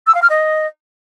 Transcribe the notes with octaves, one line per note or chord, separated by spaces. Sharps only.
E6
F5
F6
D#5